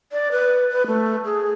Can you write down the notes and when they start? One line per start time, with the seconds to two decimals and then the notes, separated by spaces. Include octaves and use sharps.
0.12 D5
0.32 B4
0.72 B4
0.87 A3
1.25 G#4